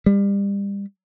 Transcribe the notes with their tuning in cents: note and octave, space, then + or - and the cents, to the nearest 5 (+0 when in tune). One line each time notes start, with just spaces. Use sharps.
G3 +30